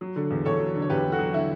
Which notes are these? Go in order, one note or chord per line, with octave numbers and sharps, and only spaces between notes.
F#3
D3
E2
E2 A4 C#5
F#3
D3
C#5
E2 G4 B4
E2
F#4 A4
F#3
D3 E4